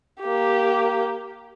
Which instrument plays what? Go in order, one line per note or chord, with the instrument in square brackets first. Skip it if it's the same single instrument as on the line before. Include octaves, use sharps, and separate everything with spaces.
[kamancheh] A#3 G4